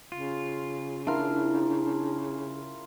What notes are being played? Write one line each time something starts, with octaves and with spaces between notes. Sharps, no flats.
C#3 F4
D4 E4 F4 A#4 F6